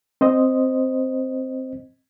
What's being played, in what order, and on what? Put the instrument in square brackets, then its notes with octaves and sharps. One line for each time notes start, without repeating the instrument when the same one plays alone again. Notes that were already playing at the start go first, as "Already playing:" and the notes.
[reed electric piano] C4 C5 D#5